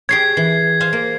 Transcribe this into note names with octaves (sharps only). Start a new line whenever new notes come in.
G4 G#4 C#5 G#6 C7
E3
C5 F5 G#5
A#3